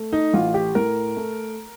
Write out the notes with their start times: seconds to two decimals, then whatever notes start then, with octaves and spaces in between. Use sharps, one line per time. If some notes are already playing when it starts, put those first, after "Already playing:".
Already playing: A3
0.13 D#4
0.33 A1 F4
0.54 G4
0.75 A2 A#4
1.17 A3